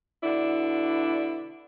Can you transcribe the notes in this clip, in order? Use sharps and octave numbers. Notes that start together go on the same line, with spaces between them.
B2 D3 D4 E4